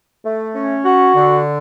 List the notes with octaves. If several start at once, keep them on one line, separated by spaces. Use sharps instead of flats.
A3
C#4
F#4
D3